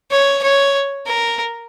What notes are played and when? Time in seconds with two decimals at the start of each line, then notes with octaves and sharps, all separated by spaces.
0.11 C#5
0.43 C#5
1.07 A#4